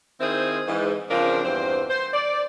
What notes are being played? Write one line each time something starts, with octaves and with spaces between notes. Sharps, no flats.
D#3 C4 E4 G#4 C5
G#2 E3
C#3 F3 C4 D4 F4 A#4
E2 G2 C4 C5
C5
D5